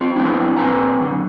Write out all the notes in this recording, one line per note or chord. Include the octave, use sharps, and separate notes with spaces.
C4 F4
F3 B3 C4 D4 E4
A#2 C4 B4 G#5 A#5
F#2 D3